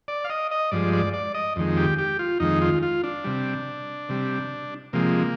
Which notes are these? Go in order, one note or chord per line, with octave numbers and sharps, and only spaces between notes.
D5
F5
D#5
D#5
G2 F3 G#3 D5
D5
D5
D#5
F2 D#3 G#3
G4
G4
F4
F2 D#3 G#3 D#4
F4
F4
D4
C3 G3
C3 G3
C3 F3 G#3 A#3